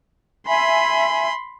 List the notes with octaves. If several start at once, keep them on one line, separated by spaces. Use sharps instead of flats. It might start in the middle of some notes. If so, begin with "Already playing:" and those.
E5 G#5 B5 C6